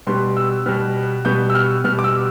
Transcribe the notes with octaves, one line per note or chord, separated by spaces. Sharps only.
B2 G3 B3 C6
E6
B2 G3 B3 F6
B2 G3 B3 G6
E6
F6
B2 G3 B3 F6
D6
E6